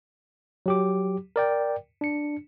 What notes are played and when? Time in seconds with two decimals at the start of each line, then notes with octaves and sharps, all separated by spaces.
0.66 F#3 G4 D6
1.36 A#4 D5 G5
2.01 D4 C#7